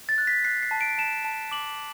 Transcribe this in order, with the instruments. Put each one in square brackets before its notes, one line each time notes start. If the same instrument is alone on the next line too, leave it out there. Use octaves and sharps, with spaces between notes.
[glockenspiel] A6
F#6
B6
F#6 C7
C7
A5
D7
A5 E7
A5
D6 F#7